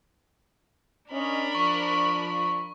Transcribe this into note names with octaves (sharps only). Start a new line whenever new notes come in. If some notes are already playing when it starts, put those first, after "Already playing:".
C#4 D4 A#4 D#5 B5
F3 C#6